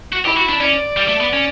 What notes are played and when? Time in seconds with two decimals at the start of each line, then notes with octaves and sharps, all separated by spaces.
0.13 F#4
0.25 E4 G4
0.37 F#4
0.49 D4
0.60 C#4 D5
0.97 G3
1.08 A3
1.20 B3
1.33 C#4